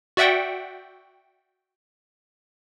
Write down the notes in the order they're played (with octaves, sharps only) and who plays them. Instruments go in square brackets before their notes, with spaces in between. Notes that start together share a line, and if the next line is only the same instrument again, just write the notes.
[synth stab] F#4 D5 E5 F#5 G5